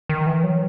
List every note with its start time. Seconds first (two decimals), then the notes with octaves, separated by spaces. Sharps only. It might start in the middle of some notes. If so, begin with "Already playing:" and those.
0.09 D#3
0.27 E3
0.44 F#3